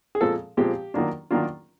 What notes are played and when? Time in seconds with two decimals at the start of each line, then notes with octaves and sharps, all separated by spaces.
0.15 G#4
0.21 A#2 F3 G#3 C4 A4
0.57 A#2 F3 G#3 C4 G4
0.94 D#3 F#3 A#3 D4 F4
1.31 D#3 F#3 A#3 D4 F4